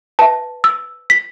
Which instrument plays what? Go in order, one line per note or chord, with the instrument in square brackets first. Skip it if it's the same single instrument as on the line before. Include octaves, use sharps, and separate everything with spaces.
[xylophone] B4 E5 A5
E6
B6